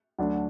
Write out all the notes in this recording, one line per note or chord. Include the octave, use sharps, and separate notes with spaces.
D2 D3 F#3 D4